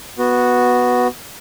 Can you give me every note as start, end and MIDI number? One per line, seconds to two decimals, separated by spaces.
0.18 1.08 59
0.18 1.08 66